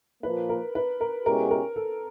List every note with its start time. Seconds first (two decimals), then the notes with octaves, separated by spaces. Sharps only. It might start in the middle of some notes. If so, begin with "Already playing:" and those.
0.23 A#2 F3 A#3 B4
0.49 A#4
0.75 B4
1.01 A#4
1.25 B2 G#3 C#4 E4 G4 A#4
1.51 A#4
1.76 A4